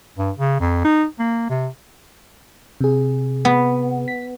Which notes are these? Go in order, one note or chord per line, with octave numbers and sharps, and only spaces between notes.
G2
C#3
F2
D#4
A#3
C3
C3 G#4
B3
B6